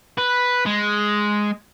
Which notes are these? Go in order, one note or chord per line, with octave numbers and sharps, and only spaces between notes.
B4
G#3